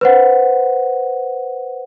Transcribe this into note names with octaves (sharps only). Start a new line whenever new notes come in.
B4 C5 F#5